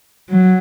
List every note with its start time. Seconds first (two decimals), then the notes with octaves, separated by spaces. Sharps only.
0.30 F#3